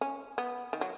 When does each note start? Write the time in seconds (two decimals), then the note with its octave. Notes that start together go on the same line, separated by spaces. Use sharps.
0.01 C#4
0.38 B3
0.73 D#3
0.81 F#3